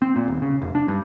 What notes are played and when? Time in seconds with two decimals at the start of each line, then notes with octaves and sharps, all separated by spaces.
0.02 C4
0.16 A#2
0.28 D#1
0.42 C#3
0.62 F1
0.75 D4
0.88 G2